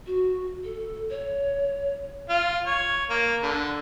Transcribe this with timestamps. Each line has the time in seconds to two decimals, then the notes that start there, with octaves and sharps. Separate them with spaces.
0.06 F#4
0.64 A4
1.10 C#5
2.30 F4
2.67 C#5
3.10 A#3
3.43 D3